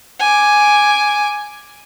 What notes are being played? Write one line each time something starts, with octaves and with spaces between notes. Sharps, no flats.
G#5 D6